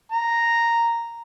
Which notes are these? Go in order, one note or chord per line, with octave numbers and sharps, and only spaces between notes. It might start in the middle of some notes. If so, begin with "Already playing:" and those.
A#5